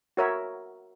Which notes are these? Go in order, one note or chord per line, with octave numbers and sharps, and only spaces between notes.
F#4 A#4 C#5 E5